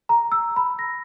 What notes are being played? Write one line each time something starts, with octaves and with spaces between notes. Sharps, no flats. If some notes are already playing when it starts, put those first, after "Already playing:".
A#5
E6
B5
A#6